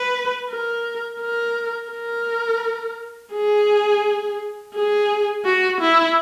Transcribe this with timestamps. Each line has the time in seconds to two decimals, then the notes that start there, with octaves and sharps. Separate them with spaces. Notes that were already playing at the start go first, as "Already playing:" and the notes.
Already playing: B4
0.50 A#4
1.21 A#4
1.91 A#4
3.33 G#4
4.74 G#4
5.45 F#4
5.80 E4